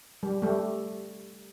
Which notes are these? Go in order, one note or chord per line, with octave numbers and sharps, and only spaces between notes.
G3
G3 A3